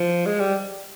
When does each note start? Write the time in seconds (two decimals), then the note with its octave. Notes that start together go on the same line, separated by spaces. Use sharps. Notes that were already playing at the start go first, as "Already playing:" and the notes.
Already playing: F3
0.26 G#3
0.40 G3